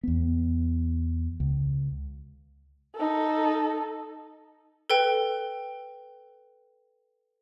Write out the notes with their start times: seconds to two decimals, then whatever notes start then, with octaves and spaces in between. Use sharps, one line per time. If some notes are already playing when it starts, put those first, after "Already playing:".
0.03 E2 B3
1.40 C#2
2.95 D#4 A4
4.90 A4 B4 G5